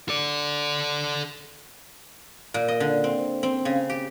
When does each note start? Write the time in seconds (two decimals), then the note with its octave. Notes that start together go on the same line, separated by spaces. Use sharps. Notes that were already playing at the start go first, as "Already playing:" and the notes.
0.09 A4 D5
2.54 A#2
2.68 D#5
2.80 D3
3.04 C4
3.43 C4
3.65 C#3
3.89 G4